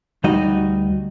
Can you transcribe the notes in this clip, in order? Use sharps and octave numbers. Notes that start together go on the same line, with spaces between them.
D2 G3 D#4 F#4 D#5